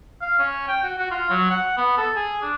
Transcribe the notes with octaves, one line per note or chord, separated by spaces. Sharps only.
F5
C#4
G5
F#4
F#4
F4
F#3
F#5
B3
A4
G#4
D4